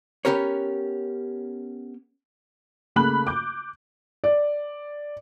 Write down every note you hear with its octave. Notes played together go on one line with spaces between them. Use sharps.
B3 C#4 G4 A#4 C#5
C#3 A3 A#3 B5 F#6 F#7
D6 G6
D5